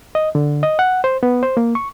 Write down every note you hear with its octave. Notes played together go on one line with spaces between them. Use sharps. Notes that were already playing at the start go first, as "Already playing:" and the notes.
D#5
D3
D#5
F#5
C5
B3
C5
A#3
C#6